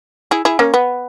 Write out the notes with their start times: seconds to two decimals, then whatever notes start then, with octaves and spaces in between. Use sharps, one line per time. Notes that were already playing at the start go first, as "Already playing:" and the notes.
0.31 E4 G#4
0.45 E4 G#4
0.59 A#3 C#4
0.74 B3